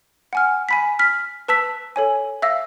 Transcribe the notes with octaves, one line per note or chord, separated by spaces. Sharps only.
F#5 G#5 F6
G#5 B5 B6
F6 B6
B4 A5 E6 B6
A4 C#5 G#5
E5 F5 E6 A#6